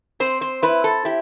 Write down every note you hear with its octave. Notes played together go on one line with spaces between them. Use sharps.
C4 C5
C5
E4 B4
A4
E4 G4